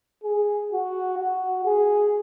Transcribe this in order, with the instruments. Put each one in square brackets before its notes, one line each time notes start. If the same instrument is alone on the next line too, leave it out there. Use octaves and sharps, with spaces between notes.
[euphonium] G#4
F#4
F#4
G#4